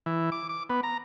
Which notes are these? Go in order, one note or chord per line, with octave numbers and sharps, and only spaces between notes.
E3
D6
D6
B3
A#5